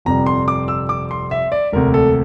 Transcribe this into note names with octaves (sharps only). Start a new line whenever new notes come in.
G1 F2 C3 G3 A#5
C6
D6
E6
D6
C6
E5
D5
E1 D2 C3 A#4
A4